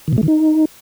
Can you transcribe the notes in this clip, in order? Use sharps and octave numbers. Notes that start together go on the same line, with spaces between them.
D#3
B2
A3
D#3
D#4